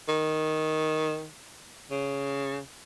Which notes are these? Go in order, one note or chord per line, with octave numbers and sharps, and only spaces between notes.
D#3
C#3